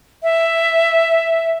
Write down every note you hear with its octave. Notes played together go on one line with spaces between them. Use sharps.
E5